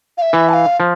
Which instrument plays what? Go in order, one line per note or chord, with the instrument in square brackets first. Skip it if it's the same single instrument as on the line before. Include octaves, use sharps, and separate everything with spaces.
[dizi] F5
E5
[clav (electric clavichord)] E3
[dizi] A5
F5
[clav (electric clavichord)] F3